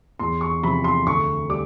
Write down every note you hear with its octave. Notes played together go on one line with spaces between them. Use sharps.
E2 C6
C#6
C3 F3 B5
C6
D2 C#6
G3 D6